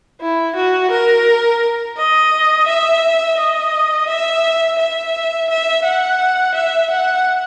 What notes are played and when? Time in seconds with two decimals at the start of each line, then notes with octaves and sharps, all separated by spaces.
0.21 E4
0.56 F#4
0.91 A#4
1.97 D#5
2.67 E5
3.38 D#5
4.08 E5
4.79 E5
5.50 E5
5.85 F#5
6.55 E5
6.90 F#5